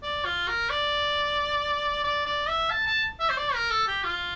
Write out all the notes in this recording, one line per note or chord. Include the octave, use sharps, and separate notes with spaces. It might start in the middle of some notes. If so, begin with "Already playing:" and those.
D5
F4
A#4
D5
D5
D5
E5
A5
A5
E5
C5
D5
A#4
A4
G4
F4